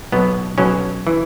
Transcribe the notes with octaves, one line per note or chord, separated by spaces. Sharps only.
B1 B2 F#3 B3
B1 B2 F#3 C#4
E3